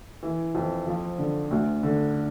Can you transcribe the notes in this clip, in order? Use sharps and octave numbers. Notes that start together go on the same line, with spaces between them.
E3
F2
F3
D3
D2
D3